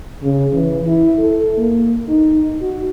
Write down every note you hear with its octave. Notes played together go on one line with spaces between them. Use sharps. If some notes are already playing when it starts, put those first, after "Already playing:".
C#3
E3
E4
A4
A#3
D#4
F#4